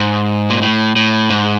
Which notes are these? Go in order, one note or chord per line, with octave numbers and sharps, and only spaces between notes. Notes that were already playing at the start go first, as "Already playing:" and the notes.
Already playing: G#2
A#2
A2
A2
G#2